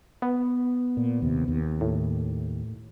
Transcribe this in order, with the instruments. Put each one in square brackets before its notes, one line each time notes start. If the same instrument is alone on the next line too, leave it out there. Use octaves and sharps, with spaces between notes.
[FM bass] B3
[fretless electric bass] A#2
D#2 C3
D#2
[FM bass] A2